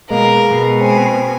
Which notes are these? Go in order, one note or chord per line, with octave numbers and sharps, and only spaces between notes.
B2 G#3 A#3 A#4
B2
C4 G#5